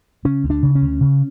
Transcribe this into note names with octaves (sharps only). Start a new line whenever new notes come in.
C#3 C#4
D2
D4
C#3
C#4
D2
C#3